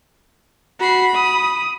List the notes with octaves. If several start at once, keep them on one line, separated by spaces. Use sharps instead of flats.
F#4 B5 C7
D#6